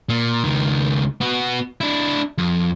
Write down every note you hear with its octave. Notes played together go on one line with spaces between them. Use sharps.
A#2
C#2 D#3
B3 F#4
D4 E4
F2